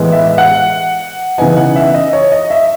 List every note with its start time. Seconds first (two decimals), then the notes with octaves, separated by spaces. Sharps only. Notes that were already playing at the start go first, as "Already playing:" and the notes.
Already playing: A2 E3 G#3 B3
0.12 E5
0.38 F#5
1.38 C#3 E3 B3 D#4 G#5
1.57 F#5
1.76 E5
1.94 D#5
2.13 C#5
2.32 D#5
2.50 E5